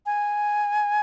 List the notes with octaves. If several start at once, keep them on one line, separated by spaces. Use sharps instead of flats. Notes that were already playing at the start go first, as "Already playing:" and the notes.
G#5